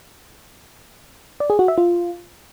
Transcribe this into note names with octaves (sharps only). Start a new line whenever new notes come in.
D5
G#4
F#4
E5
F4